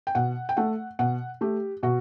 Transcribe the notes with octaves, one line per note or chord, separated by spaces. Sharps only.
G5
B2 F#5
G5
A3 F#5
B2 F#5
A3 G4
B2 F#4